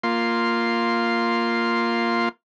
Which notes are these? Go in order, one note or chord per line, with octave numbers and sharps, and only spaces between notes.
A#3 F4 C6